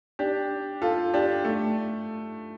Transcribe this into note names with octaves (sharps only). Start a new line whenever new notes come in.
D4 G4
F4 A4
D4 G4
A3